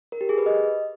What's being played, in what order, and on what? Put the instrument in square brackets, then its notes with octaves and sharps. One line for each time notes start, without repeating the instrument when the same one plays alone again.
[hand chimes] A#4
G4
G#4
B4
D#5